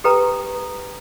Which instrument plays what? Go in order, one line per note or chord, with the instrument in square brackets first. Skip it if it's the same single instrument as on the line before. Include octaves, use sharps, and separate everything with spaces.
[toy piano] G4 A4 B4 G5 A#5